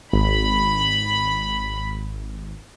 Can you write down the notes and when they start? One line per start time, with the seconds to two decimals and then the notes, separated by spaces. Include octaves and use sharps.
0.13 G#1 B5